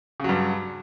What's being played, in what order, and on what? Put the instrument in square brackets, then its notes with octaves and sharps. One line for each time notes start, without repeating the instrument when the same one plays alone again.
[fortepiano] C#3
F#3
G2